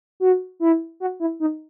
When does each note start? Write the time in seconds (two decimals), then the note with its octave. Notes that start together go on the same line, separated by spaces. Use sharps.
0.20 F#4
0.60 E4
1.00 F#4
1.20 E4
1.40 D#4